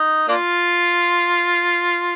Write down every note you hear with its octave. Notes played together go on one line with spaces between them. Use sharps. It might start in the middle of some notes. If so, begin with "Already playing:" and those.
Already playing: D#4
A#3 D4 F4